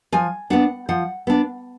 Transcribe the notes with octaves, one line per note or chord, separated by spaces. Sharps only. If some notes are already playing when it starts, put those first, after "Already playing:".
F3 G#5
B3 D4 F#5
F3 F#5
B3 D4